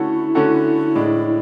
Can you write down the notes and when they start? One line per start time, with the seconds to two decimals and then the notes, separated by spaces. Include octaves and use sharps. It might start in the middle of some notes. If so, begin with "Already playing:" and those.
Already playing: D3 A3 C#4 E4 F#4 A4
0.35 D3 A3 C#4 F#4 A4
0.95 A2 G#3 D4